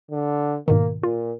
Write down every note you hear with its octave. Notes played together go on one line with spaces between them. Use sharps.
D3
G#2 B2 D#3 A#3
A#2 F4